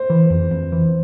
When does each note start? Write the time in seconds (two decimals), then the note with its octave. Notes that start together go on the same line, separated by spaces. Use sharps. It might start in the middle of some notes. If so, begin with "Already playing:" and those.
Already playing: C5
0.10 E3
0.30 F2
0.51 F2
0.72 E3